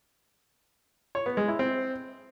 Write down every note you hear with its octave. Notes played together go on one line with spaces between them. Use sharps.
C#5
B3
G#3
E4
C4